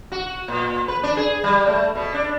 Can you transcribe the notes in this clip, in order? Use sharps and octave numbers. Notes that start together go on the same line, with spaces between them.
F#4
A#2
B4
D4
G#4
G3
A3
B2
D4